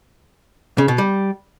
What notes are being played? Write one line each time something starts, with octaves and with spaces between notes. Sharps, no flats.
C#3
B2
G3